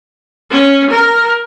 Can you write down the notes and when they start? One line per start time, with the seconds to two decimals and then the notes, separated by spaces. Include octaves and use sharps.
0.51 C#4
0.90 A#4